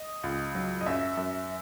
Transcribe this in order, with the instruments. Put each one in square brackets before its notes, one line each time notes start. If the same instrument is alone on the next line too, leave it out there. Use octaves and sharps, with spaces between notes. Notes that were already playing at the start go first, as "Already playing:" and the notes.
Already playing: [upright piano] D#5
C#2
F#3
D#5
F#2 E5
F#2